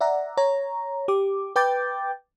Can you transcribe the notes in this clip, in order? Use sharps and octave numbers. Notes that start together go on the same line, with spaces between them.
D5 E5 F#5 A#5
C#5 A#5
G4 D6
B4 G5 D6 G6 A6